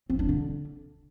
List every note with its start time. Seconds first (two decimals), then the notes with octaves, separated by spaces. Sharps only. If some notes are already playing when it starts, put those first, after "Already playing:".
0.10 C4
0.19 D4
0.29 D3